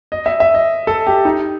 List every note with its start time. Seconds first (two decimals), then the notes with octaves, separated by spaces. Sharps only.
0.12 D#5
0.26 E5
0.40 E5
0.54 D#5
0.87 A4
1.07 G4
1.25 D#4